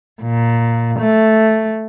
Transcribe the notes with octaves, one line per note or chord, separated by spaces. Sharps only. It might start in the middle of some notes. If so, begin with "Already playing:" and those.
A#2
A3